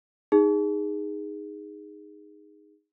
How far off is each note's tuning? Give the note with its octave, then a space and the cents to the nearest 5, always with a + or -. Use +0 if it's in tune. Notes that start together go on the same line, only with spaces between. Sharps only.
D#4 +0 G#4 -15